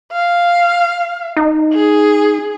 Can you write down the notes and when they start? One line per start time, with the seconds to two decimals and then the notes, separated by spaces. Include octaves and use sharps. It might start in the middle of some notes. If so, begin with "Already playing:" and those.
0.12 F5
1.37 D#4
1.73 G#4